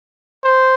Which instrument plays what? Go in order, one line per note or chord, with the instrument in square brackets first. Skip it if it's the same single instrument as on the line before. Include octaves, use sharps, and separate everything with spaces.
[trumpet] C5